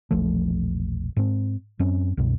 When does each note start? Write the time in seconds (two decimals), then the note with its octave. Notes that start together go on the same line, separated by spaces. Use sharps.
0.11 E1 A#1 F3 A3
1.17 G#2 C4
1.79 F#2 C4 C#4
2.17 C2 F#2 B2